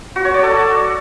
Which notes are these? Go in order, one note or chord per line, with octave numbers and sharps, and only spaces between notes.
F#4
C#5
D5
A4